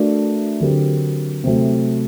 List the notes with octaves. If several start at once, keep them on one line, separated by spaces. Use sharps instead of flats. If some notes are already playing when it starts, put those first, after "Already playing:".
Already playing: A3 D4 F#4 A#4 D5
D3 F#3 C4 G4 A#4
C3 F#3 A3